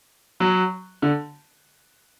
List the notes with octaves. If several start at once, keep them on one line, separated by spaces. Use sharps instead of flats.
F#3
D3